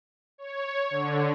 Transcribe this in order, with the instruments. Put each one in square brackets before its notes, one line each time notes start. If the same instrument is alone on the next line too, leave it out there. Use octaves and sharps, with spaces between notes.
[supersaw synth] C#5
D3